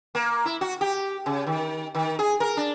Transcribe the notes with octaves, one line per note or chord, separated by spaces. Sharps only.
A#3
E4
F#4
G4
C#3
D#3
D#3
G#4
A#4
D4